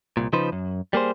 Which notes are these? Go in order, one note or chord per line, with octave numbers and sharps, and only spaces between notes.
C2 A#2
C#3 F3 D#4 B4 C5
F#2
G3 A#3 G#4 C5